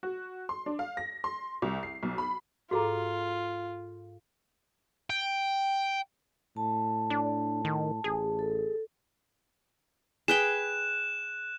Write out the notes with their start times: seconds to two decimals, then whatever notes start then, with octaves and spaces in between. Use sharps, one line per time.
0.03 F#4
0.49 C6
0.66 D4
0.79 F5
0.97 A#6
1.24 C6
1.62 C2
1.83 C7
2.03 B1
2.18 B5
2.71 G#2 F4 F#4 G#4 A4 A#5
5.10 G5
6.57 A2 A5
7.10 D4
7.65 D#3
8.04 A1 G#4
8.39 A4
10.28 G#4 B4 G5 F#6 E7